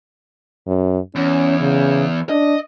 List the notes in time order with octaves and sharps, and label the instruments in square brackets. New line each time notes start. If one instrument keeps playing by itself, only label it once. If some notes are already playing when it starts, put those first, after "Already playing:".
[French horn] F#2
[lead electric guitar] E2 [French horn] C#4
[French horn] C#3
[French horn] D4 [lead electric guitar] D#5